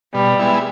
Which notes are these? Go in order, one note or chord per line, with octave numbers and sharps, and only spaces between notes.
B2 G3
G#3 B3 E4